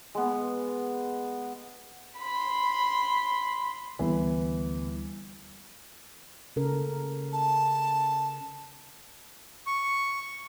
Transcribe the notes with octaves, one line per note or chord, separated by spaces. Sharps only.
G#3 B3
B5 C6
D2 E3 G3 B3
C#3 A4 A#4
A5
C#6